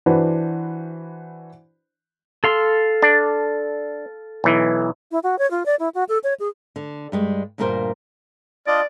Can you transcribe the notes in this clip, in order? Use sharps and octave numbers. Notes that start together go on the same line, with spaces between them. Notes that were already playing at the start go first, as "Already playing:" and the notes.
E3 D4 F#4 B4 C5
A4 F5 C6
D4
B1 E3
E4
F#4
C#5
F4
D5
E4
F#4
A4
C#5
G#4
D3
G2 G3 G#3
D2 G2 A#2 A#3 A#4 C5
D4 F4 D5 D#5